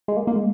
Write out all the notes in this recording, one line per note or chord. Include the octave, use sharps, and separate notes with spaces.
G#3
A#3
A#3
G#3